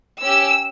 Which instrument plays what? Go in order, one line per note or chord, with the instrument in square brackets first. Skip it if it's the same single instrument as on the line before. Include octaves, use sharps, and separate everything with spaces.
[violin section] C#4 G4 E6